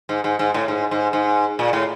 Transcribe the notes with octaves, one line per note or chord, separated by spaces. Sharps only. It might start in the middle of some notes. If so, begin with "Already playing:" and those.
G#2
G#2
G#2
A2
G#2
G#2
G#2
A#2
A2